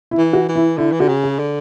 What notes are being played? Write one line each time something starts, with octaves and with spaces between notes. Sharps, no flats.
E4
E3
F#4
E3
E4
D3 E4
E3
D3 F#4
C#3
G#4
D3